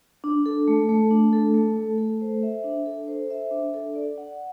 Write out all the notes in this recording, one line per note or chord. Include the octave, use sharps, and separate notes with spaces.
D4
A4
A3
A3
D4
A4
A3
A3
A4
C5
E5
D4
A4
C5
E5
D4
A4
D5
F#5